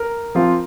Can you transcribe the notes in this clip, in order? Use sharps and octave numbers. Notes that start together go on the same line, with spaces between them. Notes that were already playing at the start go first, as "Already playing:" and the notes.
Already playing: A#4
F3 C4 F4